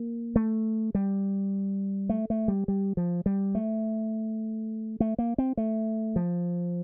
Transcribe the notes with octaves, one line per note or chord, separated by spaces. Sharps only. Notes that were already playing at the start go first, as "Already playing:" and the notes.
Already playing: A#3
A3
G3
A3
A3
G3
G3
F3
G3
A3
A3
A#3
C4
A3
F3